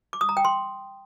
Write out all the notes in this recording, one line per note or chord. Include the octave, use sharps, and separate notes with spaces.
D6
D#6
A#5
G5
C6